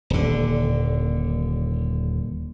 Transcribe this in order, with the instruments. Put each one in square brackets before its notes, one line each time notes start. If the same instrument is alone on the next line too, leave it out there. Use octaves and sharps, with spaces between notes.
[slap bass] D#1 D3